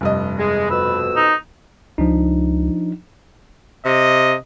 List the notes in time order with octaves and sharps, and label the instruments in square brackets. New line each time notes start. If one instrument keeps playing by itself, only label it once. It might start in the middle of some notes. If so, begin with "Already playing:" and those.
[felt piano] F1 G2 D#5
[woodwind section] G#3
[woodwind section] F2 B2 E6 [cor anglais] B4
[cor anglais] D#4
[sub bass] C#2 [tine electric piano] F3 D4 D#4
[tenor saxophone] C3 [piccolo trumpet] D#5